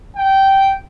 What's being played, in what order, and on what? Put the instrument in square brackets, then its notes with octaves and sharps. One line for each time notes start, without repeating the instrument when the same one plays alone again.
[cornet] G5